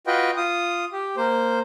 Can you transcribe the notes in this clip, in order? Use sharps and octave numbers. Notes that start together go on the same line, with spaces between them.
F4 F#4 B4 D#5 G5
F4 D#6
G4
A#3 C5